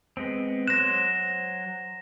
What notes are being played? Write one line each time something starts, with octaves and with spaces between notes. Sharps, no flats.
G#3 B3 C4
F#3 C5 F#6 A#6 E7